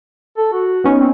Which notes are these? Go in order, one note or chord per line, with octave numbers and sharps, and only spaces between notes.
A4
F#4
B3 C#4 D#4
C4